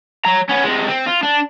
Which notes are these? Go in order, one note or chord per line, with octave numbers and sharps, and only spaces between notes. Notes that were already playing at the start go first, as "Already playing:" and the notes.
C#5 A#5
B3 C#4
C3 G#3
C4
F4
D4